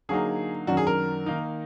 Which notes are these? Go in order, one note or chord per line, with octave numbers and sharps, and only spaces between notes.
D3 F#3 A#3 D#4 G#4
F#2 D#3 F#3 D4 F#4
G#4
A#4
D#3 A#3 D#4